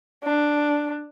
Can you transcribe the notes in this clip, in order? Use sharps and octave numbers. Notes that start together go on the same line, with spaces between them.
D4